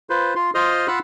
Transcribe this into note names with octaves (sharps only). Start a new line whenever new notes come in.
F4 B4 C5
F4 C6
F4 C5 D#5 C6 D#6 F6
F4 F5 F#5 B5 E6 F#6